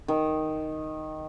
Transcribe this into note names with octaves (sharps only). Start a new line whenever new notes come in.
D#3